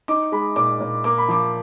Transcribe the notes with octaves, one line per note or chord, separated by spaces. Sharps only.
D#4 D6
G#3 B5
A#2 D6
A#2
A#3 D6
B5
F3 D6